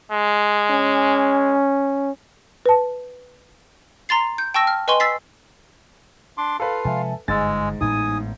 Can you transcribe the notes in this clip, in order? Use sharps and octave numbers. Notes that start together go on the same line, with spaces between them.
G#3
C#4
B4 A5
A#5 C6 A6 C7
G6
G5 A5 C#6 E6 A#6
F6
B4 D#5 G#5 C6 C#6
E6 A6 B6 C7
D4 C6 D6
F4 A4 B4 F5
C3 F3 G#3 E5 G#5 A5
G1 G#2 G#3 G#5 E6 A6
A1 A2 B3 D#4 G#5 D#6